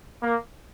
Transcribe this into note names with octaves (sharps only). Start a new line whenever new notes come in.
A#3